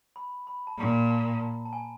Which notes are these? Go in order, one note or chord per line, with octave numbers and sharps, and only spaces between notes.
B5
B5
A5
A#2 A#5
A5
A5
A5
G#5